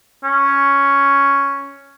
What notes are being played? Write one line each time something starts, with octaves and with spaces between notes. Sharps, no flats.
C#4